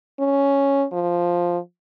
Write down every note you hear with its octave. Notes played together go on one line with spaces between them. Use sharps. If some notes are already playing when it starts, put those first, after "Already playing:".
C#4
F3